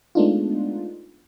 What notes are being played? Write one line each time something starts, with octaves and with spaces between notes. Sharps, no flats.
G#3 A3 B3 D4 D#4 F4